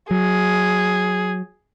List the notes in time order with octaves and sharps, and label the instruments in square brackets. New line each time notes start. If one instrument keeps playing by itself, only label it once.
[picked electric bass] F#3 [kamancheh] G#4